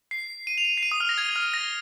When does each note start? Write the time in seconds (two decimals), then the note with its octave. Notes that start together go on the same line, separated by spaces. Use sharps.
0.11 C7
0.47 D#7
0.58 F7
0.65 D#7
0.77 C7
0.83 D#7
0.91 D#6
1.00 F6
1.09 A#6
1.18 G#6
1.36 F6
1.54 A#6